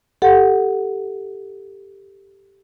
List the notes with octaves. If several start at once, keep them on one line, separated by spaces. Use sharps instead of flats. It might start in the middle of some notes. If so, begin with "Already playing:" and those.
G4 A4 F#5